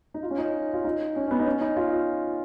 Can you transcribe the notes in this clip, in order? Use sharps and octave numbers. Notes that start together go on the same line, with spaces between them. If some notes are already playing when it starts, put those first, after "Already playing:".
D#4
F4
C#4
D#4
F4
D#4
C#4
C#4
B3
D#4
C#4
D#4
F4